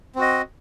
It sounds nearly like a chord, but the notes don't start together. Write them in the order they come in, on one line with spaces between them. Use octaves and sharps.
C4 F#4 D#5